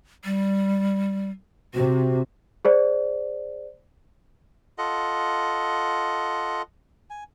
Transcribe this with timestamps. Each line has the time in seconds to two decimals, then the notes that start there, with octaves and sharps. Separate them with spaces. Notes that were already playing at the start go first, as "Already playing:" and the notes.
0.25 G3
1.74 C3 F#4
2.65 G#4 C5 D5
4.78 F4 A4 D#5 F#5
7.10 G#5